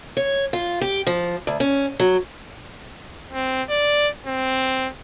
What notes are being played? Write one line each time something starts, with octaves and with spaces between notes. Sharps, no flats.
C#5
F4
G4
F3
D2
C#4
F#3
C4
D5
C4